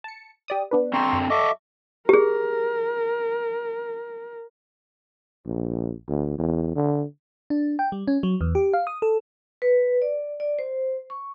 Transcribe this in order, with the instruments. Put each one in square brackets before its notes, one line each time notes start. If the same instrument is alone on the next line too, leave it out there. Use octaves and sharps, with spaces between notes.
[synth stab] A5 C#7
G4 D5 D#6
B3 D4 B4
[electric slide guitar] D3 C4 [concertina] A#5 C6 C#6
[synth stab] F#2
[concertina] A4 C#6 D6 [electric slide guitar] D#5 E5
[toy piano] G4 G#4 [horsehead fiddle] A#4
[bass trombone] A#1
D2
E2
D3
[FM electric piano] D4
G5
G3
C#4
F#3
E2
G4
F5
D#6
A4
[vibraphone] B4
D5
D5
C5
C#6